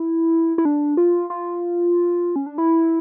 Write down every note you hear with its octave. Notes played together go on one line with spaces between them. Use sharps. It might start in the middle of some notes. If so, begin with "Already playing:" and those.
Already playing: E4
E4
D4
F4
F4
C#4
D4
E4